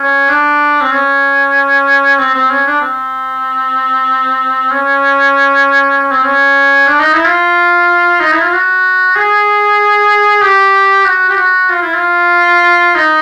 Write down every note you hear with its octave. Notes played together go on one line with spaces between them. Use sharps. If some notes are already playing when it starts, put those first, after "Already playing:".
Already playing: C#4
D4
C4
C#4
C4
C4
C#4
D4
C4
C#4
C#4
C4
C#4
D4
D#4
E4
F4
D#4
E4
F4
F#4
G#4
G4
F#4
G4
F#4
F4
E4
F4
D#4